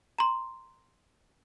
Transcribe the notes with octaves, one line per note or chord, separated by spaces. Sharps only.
A#5 C6